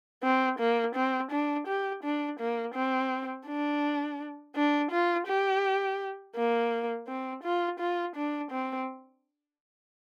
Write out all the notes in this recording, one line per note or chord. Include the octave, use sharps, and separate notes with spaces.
C4
A#3
C4
D4
G4
D4
A#3
C4
D4
D4
F4
G4
A#3
C4
F4
F4
D4
C4